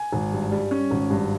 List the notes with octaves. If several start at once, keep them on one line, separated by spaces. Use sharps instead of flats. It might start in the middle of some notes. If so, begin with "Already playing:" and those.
Already playing: G#5
G#1
G2
G3
C#4
G#1
G2